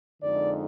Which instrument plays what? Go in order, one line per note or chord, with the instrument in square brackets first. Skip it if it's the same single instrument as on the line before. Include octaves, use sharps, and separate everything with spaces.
[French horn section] F2 D3 G#3 D#4 D5